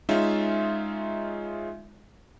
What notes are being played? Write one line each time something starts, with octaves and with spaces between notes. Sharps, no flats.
G#3 C#4 D#4 F4 E5